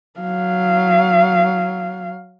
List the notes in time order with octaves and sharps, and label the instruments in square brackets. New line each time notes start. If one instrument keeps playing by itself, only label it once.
[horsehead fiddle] F#3 F5